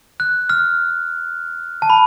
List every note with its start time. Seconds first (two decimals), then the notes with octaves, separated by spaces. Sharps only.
0.20 F#6
0.50 F6
1.82 A5
1.90 B5